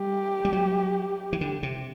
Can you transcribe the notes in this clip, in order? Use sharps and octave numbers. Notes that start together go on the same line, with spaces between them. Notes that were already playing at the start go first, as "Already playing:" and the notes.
Already playing: G3 G4
G3
F#3
E3
D3
C3